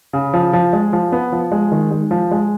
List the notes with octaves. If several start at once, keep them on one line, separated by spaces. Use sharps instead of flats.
C#3
F3
F3
G#3
F3
B3
F3
G#3
D#3
G#3
F3
G#3